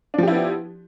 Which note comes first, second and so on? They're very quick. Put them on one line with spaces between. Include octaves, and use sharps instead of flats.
D4 F3 G4 E4 B3